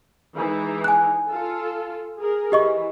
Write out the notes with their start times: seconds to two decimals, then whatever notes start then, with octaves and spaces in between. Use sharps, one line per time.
0.35 E3 G#3 D#4
0.84 G#5 F#6
1.29 F4 A4
2.19 G#4 A#4
2.52 E3 G4 D#5 C#6